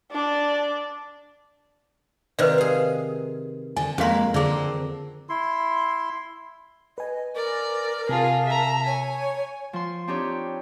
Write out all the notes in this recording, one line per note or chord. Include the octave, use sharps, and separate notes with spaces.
D4 D5
C3 D#3 B4 C5 D5
G#4 F5
D3 G#5
F2 G#3 A#3 C#4 A#4 F5 C6
D3 C4 G#4 A#4 D5
E4 C6
B4 D#5 G#5
A#4 D5
C3 F4 G#4 A5
E5 A#5
C#5 G#5
F3 C6
C4 D4 D#4 G4 C#5